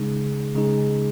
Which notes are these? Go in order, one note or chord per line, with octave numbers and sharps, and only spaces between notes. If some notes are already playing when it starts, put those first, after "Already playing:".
Already playing: C#3 G#3 D#4 G#4
C#3 G#3 D#4 G#4